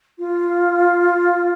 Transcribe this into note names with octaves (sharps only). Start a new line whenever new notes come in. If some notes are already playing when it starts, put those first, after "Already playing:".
F4